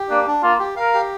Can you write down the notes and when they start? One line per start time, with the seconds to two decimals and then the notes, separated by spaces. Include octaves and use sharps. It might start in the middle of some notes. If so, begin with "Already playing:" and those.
Already playing: G4
0.10 A#3 D4
0.27 D4
0.43 A#3 F4
0.60 G4
0.76 A#4 F5
0.94 G4